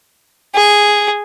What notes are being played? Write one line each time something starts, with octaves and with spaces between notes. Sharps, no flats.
G#4